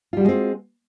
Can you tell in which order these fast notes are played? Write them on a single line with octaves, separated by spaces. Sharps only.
F4 G3 F#4 G#3 C4